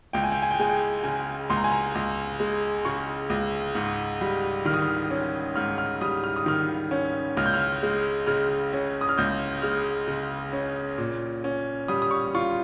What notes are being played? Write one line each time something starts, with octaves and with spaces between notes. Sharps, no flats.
C#2 G5
G#5
G5
G#5
G5
G#3 G#5
G5
C#3 G#5
C#2 C6
A#5
G#5
A#5
C#2
G#3
C#3 C#6
C#2
G#2
G3
D#3 F6
D#6
F6
C#4
G#2 F6
F6
G3 D#6
F6
D#6
D#3 F6
C#4
C#2 F6
G6
F6
G#3
C#3 F6
C#4
D#6
F6
C#2 G6
G#3 F6
C#3
C#4
A#2
C#4
G3 D#6
D#6
C#6
F4 C#6